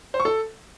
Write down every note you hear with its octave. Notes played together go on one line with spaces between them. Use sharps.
C5
C#6
A4